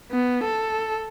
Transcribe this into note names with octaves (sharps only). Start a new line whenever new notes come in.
B3
A4